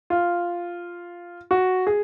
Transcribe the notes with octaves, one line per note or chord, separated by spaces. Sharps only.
F4
F#4
G#4